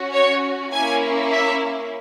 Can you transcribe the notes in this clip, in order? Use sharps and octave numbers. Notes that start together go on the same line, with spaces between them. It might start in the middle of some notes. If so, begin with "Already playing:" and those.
Already playing: C#4 F#4
C#5
A#3 C#4 E4 G#5
E5